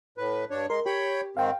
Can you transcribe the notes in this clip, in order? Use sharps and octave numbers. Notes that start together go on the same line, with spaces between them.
A2 B4
G2 D4 C#5
G#3 A#4 C6
G4 C#5 G5 B5
G#2 D#3 C4 F5 G5